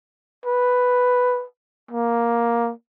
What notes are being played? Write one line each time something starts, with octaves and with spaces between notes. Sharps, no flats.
B4
A#3